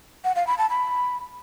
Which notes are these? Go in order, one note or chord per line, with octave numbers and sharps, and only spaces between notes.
F#5
F5
B5
A5
B5